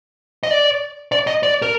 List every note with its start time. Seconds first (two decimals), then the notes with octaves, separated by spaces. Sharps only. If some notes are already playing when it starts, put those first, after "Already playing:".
0.43 D#5
0.51 D5
1.12 D5
1.27 D#5
1.43 D5
1.62 A#4